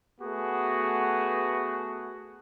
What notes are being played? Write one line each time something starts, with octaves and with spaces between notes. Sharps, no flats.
A3 B3 F#4 G#4